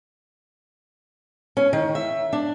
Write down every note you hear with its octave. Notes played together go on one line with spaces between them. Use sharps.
C#4
D#3
E5
D4